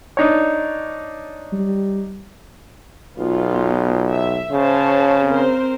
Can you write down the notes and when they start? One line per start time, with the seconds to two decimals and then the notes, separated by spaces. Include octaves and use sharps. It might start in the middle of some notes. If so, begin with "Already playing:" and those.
0.17 D4 D#4 C#5
1.53 G3
3.18 B1 B3 F4
4.09 E5
4.52 C#3 C5 C#5 A5
5.27 C4 A#4 C5